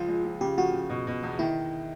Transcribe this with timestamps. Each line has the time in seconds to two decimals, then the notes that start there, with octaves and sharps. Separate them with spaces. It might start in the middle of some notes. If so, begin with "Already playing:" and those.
Already playing: C#2 F3 F4
0.08 G#3
0.25 F3
0.41 C#3 G4
0.58 F3 F#4
0.74 C#3
0.90 B2
1.07 B2
1.23 E2
1.39 D#3 E4